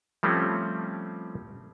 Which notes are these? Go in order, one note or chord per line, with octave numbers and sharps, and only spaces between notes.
F3 G3 A3 C4 C#4